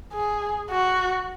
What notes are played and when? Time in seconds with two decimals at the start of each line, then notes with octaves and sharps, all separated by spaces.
0.13 G#4
0.70 F#4